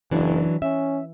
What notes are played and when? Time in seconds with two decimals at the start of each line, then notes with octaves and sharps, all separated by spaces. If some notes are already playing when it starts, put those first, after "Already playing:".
0.11 F#1 E3 F#3 D4
0.62 C#4 E5